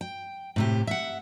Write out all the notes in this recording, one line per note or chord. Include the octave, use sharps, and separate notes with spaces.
G5
A2 C3 G4
E5 F#5